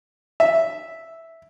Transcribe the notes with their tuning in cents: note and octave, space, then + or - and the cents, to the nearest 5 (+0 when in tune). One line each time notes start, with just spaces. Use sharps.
E5 -5